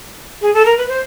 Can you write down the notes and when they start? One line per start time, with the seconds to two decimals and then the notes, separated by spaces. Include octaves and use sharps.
0.42 G#4
0.54 A4
0.65 A#4
0.78 B4
0.89 C5